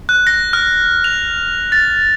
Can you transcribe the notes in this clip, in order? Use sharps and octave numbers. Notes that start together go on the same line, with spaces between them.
F#6
A#6
F6
F7
A6